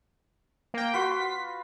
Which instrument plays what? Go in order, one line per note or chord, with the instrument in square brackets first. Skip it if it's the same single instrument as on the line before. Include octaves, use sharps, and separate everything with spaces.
[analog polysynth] A#3 G5
[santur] F4 F#4 B4 [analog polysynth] C6 B6